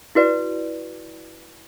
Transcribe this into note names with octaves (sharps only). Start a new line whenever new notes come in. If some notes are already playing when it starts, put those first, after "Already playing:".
E4 F#4 B4 D5